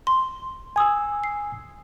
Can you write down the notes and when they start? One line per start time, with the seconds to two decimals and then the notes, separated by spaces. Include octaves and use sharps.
0.07 C6
0.76 G#5 D#6 E6 G#6
1.24 C7